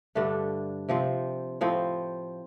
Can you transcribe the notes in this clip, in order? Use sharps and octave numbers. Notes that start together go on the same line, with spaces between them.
G2 D3 A3 D4
C3 F3 C4
A2 F3 C4